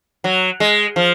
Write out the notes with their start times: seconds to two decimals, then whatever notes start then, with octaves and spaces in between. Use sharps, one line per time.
0.24 F#3
0.60 G#3
0.96 F3